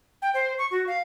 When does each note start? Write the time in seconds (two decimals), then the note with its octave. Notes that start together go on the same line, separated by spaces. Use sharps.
0.22 G5
0.34 C5
0.58 C#6
0.71 F#4
0.87 F5